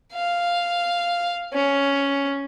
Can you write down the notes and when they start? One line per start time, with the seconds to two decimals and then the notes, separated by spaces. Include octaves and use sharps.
0.13 F5
1.53 C#4